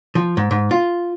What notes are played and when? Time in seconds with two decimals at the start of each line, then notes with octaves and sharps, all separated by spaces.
0.15 F3
0.37 G#2
0.51 G#2
0.71 F4